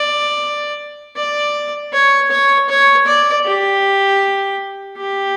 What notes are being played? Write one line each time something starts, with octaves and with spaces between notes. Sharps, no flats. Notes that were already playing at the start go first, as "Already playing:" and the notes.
Already playing: D5
D5
C#5
C#5
C#5
D5
G4
G4